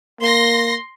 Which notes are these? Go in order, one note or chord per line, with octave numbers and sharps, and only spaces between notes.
A#3 C6 A#6